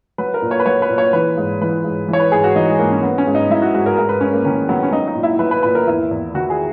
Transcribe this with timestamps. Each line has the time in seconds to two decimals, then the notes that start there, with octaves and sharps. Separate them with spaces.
0.18 F#3 B4
0.34 A#4
0.42 A#2
0.51 C#5
0.60 B4
0.66 F#3 C#5
0.82 B4
0.89 A#2
0.98 C#5
1.13 E3 B4
1.37 G#2
1.61 E3 B4
1.84 G#2
2.08 E3
2.13 C#5
2.20 B4
2.32 G#2 G#4
2.44 F#4
2.56 E3 D#4
2.68 G#3
2.79 G#2 A#3
2.91 C#4
3.02 F#3 B3
3.18 C#4
3.27 G#2
3.35 D#4
3.50 F#3 E4
3.62 F#4
3.73 G#2 F#4
3.86 A#4
3.97 G#2 A#4
4.09 B4
4.21 G#2 C#4
4.33 A#3
4.45 D#3 C#4
4.69 F#3 B3
4.83 C#4
4.92 F#3 D#4
5.08 D#4
5.15 A#2
5.23 E4
5.39 F#3 B4
5.51 B4
5.63 A#2 B4
5.75 A#4
5.87 E2 E4
6.11 E2
6.34 D#3 F#4
6.50 G#4